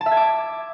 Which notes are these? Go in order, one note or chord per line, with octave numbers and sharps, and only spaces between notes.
A5
E5
G#6
D6